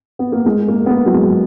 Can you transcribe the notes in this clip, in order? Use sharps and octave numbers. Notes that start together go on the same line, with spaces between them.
B3
A#3
G#3
A#3
B3
A#3
F#3
G#3